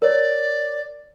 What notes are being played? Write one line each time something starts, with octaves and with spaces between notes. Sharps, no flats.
A#4 C#5 D5